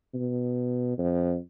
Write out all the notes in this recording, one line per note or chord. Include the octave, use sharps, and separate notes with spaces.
B2
F2